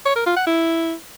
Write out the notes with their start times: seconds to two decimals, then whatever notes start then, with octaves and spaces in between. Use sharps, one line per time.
0.05 C#5
0.16 A#4
0.26 F4
0.36 F#5
0.47 E4